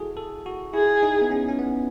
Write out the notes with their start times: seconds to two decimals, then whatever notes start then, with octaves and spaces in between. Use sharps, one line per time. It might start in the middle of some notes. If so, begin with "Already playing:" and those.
Already playing: E4 F#4 G#4 A4
0.17 A4
0.46 F#4
0.74 E4 G#4
1.03 D#4
1.22 B3
1.31 C#4
1.48 C#4
1.59 B3